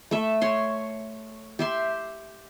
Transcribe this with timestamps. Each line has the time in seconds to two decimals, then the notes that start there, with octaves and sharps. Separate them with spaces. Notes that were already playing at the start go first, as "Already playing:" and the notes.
0.11 A3 E5
0.41 C#5 C6
1.59 G4 E5 C6